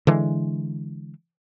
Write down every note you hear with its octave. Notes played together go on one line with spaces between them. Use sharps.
D3 E3 G#3